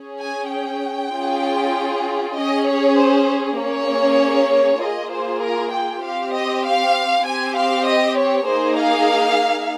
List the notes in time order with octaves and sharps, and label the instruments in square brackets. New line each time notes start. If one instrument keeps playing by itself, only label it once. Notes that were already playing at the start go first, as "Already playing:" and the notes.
Already playing: [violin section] C#4 G#4
G#5
G5
C#4 F4 G#4
C#4 G#4 D#5
C#5
C5
A#3 C#4 G#4 C#5
A#3 F4 G#4 D#5
C5
A#4
G5
C4 G4 F5
D#5
F5
C4 G4 G#5
F5
D#5
C#5
A#3 D#4 G#4 C5
F5